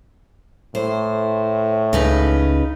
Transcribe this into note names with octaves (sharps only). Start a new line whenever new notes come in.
A2 C5
C#2 C#3 D#4 B4